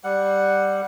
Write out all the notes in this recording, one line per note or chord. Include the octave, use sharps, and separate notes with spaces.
G3 F#5